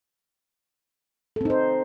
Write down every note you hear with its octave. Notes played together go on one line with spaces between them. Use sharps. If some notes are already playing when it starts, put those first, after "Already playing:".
C4 D#4 A4 C5